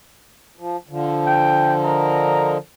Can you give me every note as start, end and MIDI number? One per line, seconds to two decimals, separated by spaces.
0.58 0.77 53
0.89 2.57 50
0.89 2.57 53
1.27 1.73 79
1.84 2.55 70
1.84 2.55 75
1.84 2.55 82